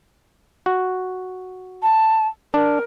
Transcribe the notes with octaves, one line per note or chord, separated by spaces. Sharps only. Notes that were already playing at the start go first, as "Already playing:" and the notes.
F#4
A5
D4 A#4